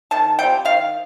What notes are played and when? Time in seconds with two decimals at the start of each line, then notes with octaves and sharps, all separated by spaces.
0.11 D#3 A5
0.39 G3 C4 F4 G5
0.65 D#3 F5